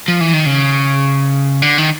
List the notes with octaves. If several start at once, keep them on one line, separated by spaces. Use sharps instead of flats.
F3
E3
D#3
C#3
D3
D#3